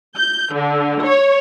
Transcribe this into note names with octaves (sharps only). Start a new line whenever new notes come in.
G6
D3
C#5